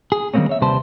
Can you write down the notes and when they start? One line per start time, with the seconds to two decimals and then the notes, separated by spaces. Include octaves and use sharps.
0.12 G#4
0.34 D#3 G3 G#3 A#3 C4 C#4
0.49 C#5 E5
0.61 D#2 C3 G3 B4 C5 A5